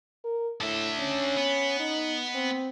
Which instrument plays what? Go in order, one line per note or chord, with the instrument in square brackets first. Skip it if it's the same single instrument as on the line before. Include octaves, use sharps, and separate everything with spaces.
[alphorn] A#4
[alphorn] A2 [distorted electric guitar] D3 E5
[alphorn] C#4
[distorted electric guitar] B3
[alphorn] D#4
C4